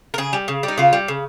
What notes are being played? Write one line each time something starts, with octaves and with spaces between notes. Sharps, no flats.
A#4
C#3 G#4
G3
C#3
G3
D#4
C#3 F4
G3
C#3